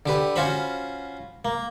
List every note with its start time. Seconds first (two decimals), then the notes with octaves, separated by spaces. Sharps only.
0.06 D3 G4 B4
0.36 C#4 F4 F#4 C5 B5
1.45 A#3